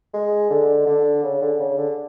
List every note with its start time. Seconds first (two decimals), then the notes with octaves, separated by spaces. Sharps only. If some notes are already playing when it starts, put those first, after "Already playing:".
0.14 G#3
0.50 D3
0.86 D3
1.24 C#3
1.42 D3
1.60 C#3
1.78 D3